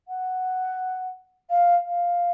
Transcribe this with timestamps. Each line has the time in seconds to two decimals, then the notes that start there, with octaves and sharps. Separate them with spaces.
0.08 F#5
1.50 F5
1.86 F5